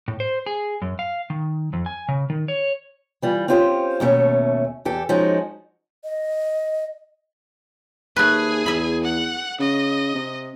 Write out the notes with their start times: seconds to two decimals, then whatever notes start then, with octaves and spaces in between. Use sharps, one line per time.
0.08 A2
0.20 C5
0.46 G#4
0.82 F#2
0.99 F5
1.30 D#3
1.73 F2
1.86 G#5
2.09 C#3
2.30 D#3
2.48 C#5
3.22 E3 G3 F4
3.48 C4 C#4 F4 G4 A#4 C5
4.00 D#2 B2 A3 C#4
4.85 E2 G4 A4
5.09 F3 G#3 C#4 D#4 F#4
6.04 D#5
8.16 D#2 A3 G#4 B4 G#5
8.66 E2 E5 B5
9.04 F#5
9.60 C#3 D#5
10.15 C3